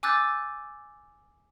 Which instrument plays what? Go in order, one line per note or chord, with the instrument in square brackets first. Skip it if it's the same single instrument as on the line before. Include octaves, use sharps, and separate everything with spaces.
[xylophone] G#5 D6 E6 F#6 G6 A6